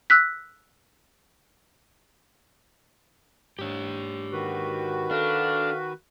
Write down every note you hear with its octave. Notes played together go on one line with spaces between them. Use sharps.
E6 F#6 B6
G#2 D4 G4 C#5
D#3 F#4 B4
D4 A4 D5 F5